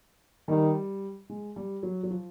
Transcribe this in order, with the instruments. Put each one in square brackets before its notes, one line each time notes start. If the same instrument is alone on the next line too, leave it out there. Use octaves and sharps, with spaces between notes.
[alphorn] D#3 [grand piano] G3
[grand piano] G#3
G3
F#3
F#3
F3